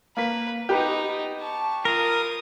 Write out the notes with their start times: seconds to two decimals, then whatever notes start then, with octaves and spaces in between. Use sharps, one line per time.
0.17 A#3 B4 B6
0.69 B3 D#4 G4 B4
1.41 A5 C#6
1.85 F4 A#4 D#6